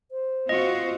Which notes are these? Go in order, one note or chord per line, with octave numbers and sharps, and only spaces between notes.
C5
C4 F4 F#4 D#5